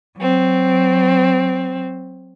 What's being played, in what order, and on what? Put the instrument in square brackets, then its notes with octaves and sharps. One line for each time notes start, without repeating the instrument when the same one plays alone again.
[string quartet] F#3 C4